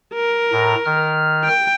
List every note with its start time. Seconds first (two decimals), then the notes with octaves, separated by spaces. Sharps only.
0.14 A#4
0.52 A2 A#5
0.85 D#3 F6
1.44 G5